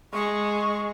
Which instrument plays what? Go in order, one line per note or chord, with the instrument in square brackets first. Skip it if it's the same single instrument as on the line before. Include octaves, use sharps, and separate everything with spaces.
[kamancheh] G#3 [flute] C#6